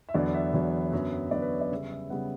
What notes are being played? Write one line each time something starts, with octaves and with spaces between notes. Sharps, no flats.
E5
E2 D3 F#3 B3 D5
E5
E2 D3 F#3 B3
F#2 D3 F#3 B3
F#2 D3 F#3 B3 D5
B4
C#5
D5
C#3 G3 B3 E5
E5
C#3 G3 B3 F#5